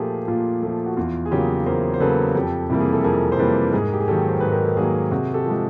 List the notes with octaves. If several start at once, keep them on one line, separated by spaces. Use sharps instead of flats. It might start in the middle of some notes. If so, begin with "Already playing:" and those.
Already playing: A#2 F3 A3 F4 G4 G#4 A#4
A#2 F4
F3 A3
F#4
E2 F4
G#4
C#3 F#3 A#3 F4 G4
E2 A#4 C5
C5
C#3 F#3 A#3 A4 B4
F2 G4 A4
C3 E3 G3 A#3
G#4
A4
F2 G#4 A#4
C5
C3 E3 G3 A#3 A4 B4
G#2 G#4 A#4
G4
G#4
D#3 F#3 A#3 G4 A4
C5
G#2 B4
A#4
A4
D#3 F#3 A#3 F#4 G#4
C3 F#4 G#4
G4 A4
F3 G#3